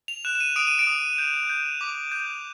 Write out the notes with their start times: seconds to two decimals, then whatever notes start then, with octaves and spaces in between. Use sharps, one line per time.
0.08 F7
0.25 F#6 E7
0.35 E7
0.40 D#7
0.56 D#6 D7
0.67 D#7
0.79 D7
0.87 D#6
1.18 G6
1.49 G6
1.81 D6
2.12 G6